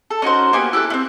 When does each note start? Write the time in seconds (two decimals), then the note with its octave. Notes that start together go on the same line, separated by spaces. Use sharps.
0.11 A4
0.22 C#4 D#4 F#4 C5
0.53 A#3 B3 G4 G#5
0.73 E4 G4 A4 F#6
0.90 A3 C4